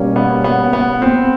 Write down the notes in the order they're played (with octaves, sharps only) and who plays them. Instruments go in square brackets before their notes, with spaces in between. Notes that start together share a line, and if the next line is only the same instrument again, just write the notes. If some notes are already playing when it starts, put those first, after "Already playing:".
Already playing: [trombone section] B2 G3 A#3 C#4
[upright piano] B3
B3
B3
C4